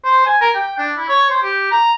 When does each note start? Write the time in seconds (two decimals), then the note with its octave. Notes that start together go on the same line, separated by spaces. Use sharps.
0.04 C5
0.26 G#5
0.41 A#4
0.55 G5
0.78 D4
0.97 E4
1.09 C#5
1.30 C5
1.42 G4
1.71 A#5